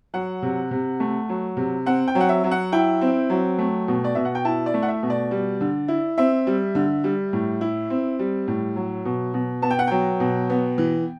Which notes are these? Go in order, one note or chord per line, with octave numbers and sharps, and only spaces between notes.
F#3 F#5
C3
C3
A3
F#3
C3
C4 F#5
G5
F#3
F#5
E5
F#3
F#5
E4 G5
C4
F#3
A3
B2
D5
B2 E5
F#5
G5
E4 A5
D5
A3
F#5
E5
B2
D5
G3
D3
E4
C4 E5
G3
D3
G3
A2
E4
C4
G3
A2
F#3
B2
B2
B3 A5
G5
F#5
F#3 G5
B2
B3
E3